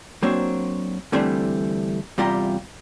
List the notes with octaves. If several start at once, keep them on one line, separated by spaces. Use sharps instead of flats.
F#3 A#3 C4 D4 C5 C#5
D3 E3 G3 A3 C4 D4
E2 C3 G3 F4 G4 A#5